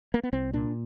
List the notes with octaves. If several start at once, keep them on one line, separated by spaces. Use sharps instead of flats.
A#3
B3
C2 C4
A#2 D4